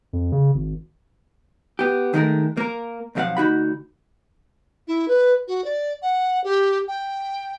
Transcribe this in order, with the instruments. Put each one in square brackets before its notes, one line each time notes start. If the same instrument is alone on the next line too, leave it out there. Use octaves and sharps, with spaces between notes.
[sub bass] F2
C#3
G#1
[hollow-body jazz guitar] B3 G4
D#3 G#3 A3 A#4
A#3 A#4
B1 F2 F3 D#5 F5 F#5
D2 D#4 F#4 B5
[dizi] E4
B4
F#4
D5
F#5
G4
G5